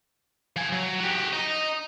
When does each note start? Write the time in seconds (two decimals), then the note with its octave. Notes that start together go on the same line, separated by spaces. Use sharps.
0.56 F3 G#5
0.72 F#3
1.00 F#4 G4
1.33 D#5 A#5